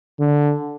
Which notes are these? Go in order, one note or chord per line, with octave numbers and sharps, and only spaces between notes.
D3